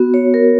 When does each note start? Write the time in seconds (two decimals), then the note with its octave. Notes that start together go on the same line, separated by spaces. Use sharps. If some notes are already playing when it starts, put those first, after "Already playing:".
Already playing: B3 F#4
0.14 C#5
0.34 A#4